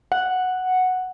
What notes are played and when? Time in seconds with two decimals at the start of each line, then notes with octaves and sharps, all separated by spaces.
0.12 F#5